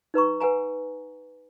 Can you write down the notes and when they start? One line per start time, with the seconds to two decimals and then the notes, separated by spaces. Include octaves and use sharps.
0.14 D#4 B4 A#5 C#6
0.40 B4 F#5 G#5 A#5